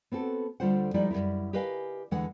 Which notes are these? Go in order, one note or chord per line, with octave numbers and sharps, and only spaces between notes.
B3 C4 F#4 A4
D2 D3 G3 F4 C5 F#5
F3 G3 G#3 D#4 E4 D5
F#2 A#2 G3 E4
G4 A#4 B4 D#5 F5 G#5
E2 D3 E3 G#3 F#5